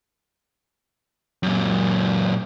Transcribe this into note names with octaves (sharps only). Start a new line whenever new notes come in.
F#2 A#2